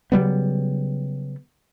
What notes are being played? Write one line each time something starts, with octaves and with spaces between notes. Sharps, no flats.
C#3 F#3 G3 B3